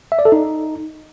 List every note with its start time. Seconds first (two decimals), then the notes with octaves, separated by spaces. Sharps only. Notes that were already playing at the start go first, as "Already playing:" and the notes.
0.12 E5
0.19 D5
0.25 A4
0.32 D#4